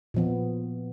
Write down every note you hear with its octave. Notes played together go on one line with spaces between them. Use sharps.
A#2 F3 B3